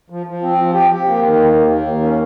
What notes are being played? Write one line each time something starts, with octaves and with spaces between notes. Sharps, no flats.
F3
F3
C4
F3
G4
G4
A#3
D#3
D#2
D#2
A#3
D#2
C#4